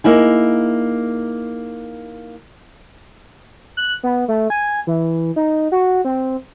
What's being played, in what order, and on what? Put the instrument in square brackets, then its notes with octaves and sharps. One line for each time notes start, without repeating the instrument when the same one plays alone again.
[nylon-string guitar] A#3 D#4 E4 G#4
[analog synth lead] F#6
B3
A3
G#5
E3
D#4
F#4
C4